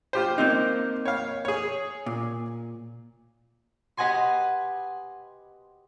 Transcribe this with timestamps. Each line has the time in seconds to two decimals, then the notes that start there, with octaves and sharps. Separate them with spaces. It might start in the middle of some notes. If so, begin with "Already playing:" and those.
0.13 F4 G4 C5
0.38 A#3 C4 D#4
1.05 C#5 F5
1.45 G#4 C#5
2.06 A#2
3.97 G4 B4 D#5 F#5 G#5 C6